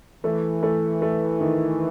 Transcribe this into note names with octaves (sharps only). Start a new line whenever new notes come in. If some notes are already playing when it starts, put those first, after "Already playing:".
E3 A3
A3
A3
D#3